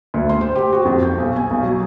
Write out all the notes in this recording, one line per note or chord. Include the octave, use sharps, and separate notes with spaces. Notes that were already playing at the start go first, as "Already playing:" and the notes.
D2
C6
C5
G4
F#4
F2
G6
B1
G#5
B1
F#3